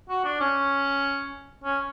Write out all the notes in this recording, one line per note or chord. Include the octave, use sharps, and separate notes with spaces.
F#4
D4
C#4
C#4